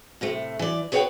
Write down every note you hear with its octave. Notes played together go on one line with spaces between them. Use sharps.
A2 C3 A3
E3 D5
G#4 B4 C#5 D5 F#5 G5